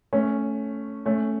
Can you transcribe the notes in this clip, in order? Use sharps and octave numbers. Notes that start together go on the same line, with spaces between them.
A3 C#4
A3 C#4